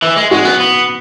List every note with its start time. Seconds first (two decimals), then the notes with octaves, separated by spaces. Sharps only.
0.02 E3
0.16 G#3
0.31 G#3 F#4
0.45 B3
0.60 B3